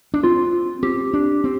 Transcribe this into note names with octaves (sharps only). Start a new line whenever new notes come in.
D4
C4 F4
C4 G4
D4
C4